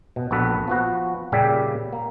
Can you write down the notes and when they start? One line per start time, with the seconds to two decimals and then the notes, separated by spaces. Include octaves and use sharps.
0.16 B2
0.31 A#1 A#2 B3 F#4 A4 B4
0.68 F3 B3 F#4
1.32 A#2 C#3 G3 G4 D5 E5
1.93 A#3